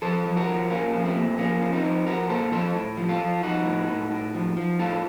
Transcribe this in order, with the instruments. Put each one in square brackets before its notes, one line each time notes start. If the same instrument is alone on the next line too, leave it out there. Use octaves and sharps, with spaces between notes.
[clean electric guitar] F3 A4 C5
F3
F#4 A#4
F3
A#2 A#3 C#4
F3
A3 C4
A#2
F3 A#3 C#4
F3
C4 D#4
F3
F3 F#4 A#4
A#2 A4 C5
F3 A4 C5
A2
F3
F4 A4
F3
F3 D#4 F#4
A2
A2
A2
F3
F3
A2 F4 A4